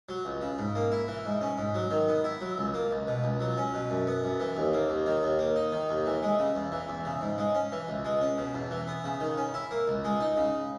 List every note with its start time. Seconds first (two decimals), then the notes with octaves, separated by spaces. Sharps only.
0.09 F#3
0.25 C#2
0.42 C#3
0.59 G#2
0.75 A#3
0.92 E4
1.08 E3
1.25 G#2
1.41 C#4
1.58 G#2
1.75 F#3
1.91 D#3
2.08 B3
2.24 E4
2.41 F#3
2.58 C#2
2.74 A#3
2.91 C#2
3.08 B2
3.24 C#2
3.40 F#3
3.57 C#4
3.74 B2
3.90 F#2
4.07 B3
4.24 F#2
4.40 E3
4.57 D#2
4.73 A#3
4.90 D#2
5.07 D#3
5.23 D#2
5.39 A#3
5.56 D#4
5.73 D#3
5.89 D#2
6.06 E3
6.23 G#3
6.39 C#3
6.55 E2
6.72 E3
6.89 E2
7.05 C#3
7.21 G#2
7.38 G#3
7.55 C#4
7.72 E3
7.89 C#2
8.05 G#3
8.21 C#4
8.38 B2
8.54 E2
8.71 E3
8.87 B3
9.04 C#3
9.20 D#3
9.38 C#4
9.54 E4
9.71 A#3
9.88 C#2
10.04 G#3
10.21 D#4
10.37 C#3